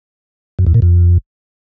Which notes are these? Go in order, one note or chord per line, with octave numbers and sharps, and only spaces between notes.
F#2
E2
A#2
F2